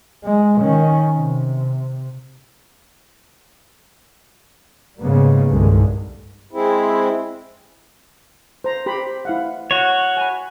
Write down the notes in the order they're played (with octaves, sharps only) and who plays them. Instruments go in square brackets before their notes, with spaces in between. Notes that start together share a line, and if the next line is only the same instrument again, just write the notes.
[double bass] G#3
D#3 C#4
C3
[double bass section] G#2 C#3 G3 A#3 B3
C2 G2 D3 D#3 G#3
[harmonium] G#3 C4 E4
[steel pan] C5 A#5
G4 C5 B5
E4 F5 F#5
[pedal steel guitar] F#4 C#5
[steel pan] G#5 B5